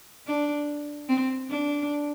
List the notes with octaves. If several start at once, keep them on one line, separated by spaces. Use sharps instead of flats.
D4
C4
D4